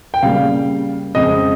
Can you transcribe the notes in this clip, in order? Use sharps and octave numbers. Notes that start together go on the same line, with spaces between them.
G5
C#3 G3 A#3 F5
F2 C#3 G#3 C4 D#5